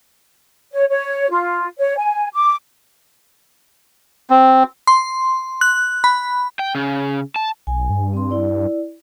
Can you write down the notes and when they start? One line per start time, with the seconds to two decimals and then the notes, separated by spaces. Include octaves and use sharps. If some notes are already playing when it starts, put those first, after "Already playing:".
0.72 C#5
0.88 C#5
1.30 F4
1.79 C#5
1.97 G#5
2.34 D6
4.30 C4
4.87 C6
5.61 F#6
6.04 B5
6.59 G5
6.75 C#3
7.36 A5
7.67 B1 G#5
7.90 G2
8.14 C4 C6
8.31 E4 D5